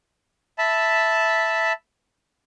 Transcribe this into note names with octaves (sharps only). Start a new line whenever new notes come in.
E5 A5 B5